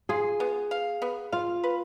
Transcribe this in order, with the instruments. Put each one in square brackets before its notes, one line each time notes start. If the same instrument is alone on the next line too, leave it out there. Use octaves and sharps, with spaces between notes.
[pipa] F4 [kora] G#4
[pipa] B3
F5
B3
[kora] F4 [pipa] F5
[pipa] B4